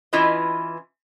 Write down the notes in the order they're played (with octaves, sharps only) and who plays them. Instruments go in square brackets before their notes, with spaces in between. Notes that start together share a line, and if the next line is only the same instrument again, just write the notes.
[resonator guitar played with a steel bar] E3 C#4 E4 F4 B4 D#5